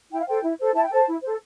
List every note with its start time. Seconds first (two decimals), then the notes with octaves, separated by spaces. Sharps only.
0.12 E4 G5
0.20 F5
0.27 A4 C5 G5
0.43 E4
0.59 A4 C5
0.75 E4 A5
0.84 G5
0.91 A4 C5 A5
1.07 E4
1.22 A4 C5